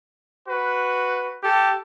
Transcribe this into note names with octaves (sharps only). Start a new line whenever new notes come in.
F#4 B4
G4 A4